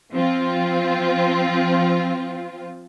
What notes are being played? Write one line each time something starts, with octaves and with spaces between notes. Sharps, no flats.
F3 C4 F4